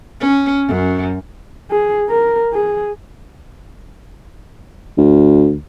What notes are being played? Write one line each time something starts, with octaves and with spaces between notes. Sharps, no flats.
C#4
F#2
G#4
A#4
G#4
D2